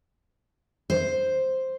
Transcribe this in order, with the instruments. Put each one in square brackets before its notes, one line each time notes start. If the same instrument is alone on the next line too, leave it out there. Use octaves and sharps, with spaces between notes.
[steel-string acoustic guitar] C5